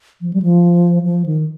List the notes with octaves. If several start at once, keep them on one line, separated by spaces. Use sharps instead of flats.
F3
G3
F3
F3
D#3